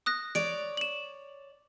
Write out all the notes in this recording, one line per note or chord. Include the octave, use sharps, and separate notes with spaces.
D#6 F#6 A#6
C#5 D5 D7
E7 F#7